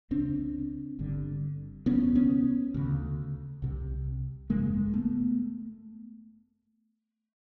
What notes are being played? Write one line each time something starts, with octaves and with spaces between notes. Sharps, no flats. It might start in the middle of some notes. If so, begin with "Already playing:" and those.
C#2 C#3 C4 D4
G1 G2 D3
D2 C3 B3 C#4
B3 C#4
D2 C#3
C2 C3
G#1 F#2 C#3 G#3 A#3
A3 B3